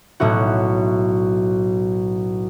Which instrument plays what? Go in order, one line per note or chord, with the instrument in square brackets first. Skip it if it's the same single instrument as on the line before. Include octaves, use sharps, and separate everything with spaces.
[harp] B1 A2 E4 F#4